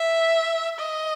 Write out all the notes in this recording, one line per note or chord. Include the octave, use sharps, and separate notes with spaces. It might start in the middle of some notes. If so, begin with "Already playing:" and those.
Already playing: E5
D#5